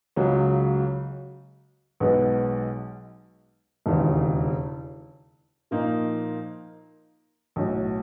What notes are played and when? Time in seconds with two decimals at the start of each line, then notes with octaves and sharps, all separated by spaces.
0.16 C#2 C#3 F#3
2.00 B1 B2 G#3 B3 D#4
3.86 E1 D#2 C#3 E3
5.71 A#2 F3 A#3 D#4
7.56 B1 A2 F#3